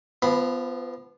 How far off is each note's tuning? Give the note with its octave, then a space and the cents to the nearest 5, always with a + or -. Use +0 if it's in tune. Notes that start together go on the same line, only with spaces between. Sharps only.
F3 -25 B3 +15 B5 +0